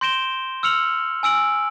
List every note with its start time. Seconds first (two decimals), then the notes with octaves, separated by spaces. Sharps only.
0.01 C6 G6 A#6 D7 E7 G7
0.63 E6 F6 C#7 F7 F#7
1.23 G#5 E6 D7 F#7